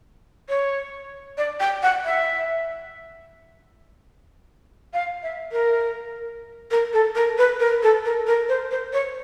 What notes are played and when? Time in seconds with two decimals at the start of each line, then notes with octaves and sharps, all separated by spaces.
0.49 C#5
1.37 D5
1.60 G5
1.83 F#5
2.05 E5
4.93 F5
5.23 E5
5.52 A#4
6.71 A#4
6.93 A4
7.15 A#4
7.38 B4
7.60 A#4
7.83 A4
8.05 A#4
8.27 A#4
8.49 C5
8.71 C5
8.93 C#5